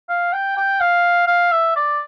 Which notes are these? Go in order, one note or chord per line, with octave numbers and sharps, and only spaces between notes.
F5
G5
G5
F5
F5
E5
D5